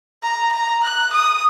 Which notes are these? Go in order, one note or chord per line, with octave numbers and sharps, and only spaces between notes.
A#5
A#5
F#6
D#6